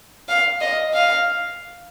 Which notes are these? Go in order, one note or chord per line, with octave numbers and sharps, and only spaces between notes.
F5
D#5
F5